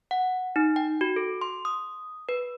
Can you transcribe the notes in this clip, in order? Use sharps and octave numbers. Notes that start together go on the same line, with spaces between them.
F#5
D#4
G5
F#4
A4
C6
D#6
B4